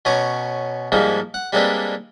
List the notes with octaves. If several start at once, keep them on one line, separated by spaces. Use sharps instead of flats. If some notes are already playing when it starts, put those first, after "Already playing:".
B2 C#4 G#5 A#5 D6
G#2 F3 G3 G#3 A#3
F#5
G3 G#3 A#3 C4 D4 B4